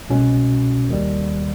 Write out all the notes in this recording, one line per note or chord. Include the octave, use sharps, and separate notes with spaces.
C2 B2 G#3 C#4 F#4
D#2 D#3 G3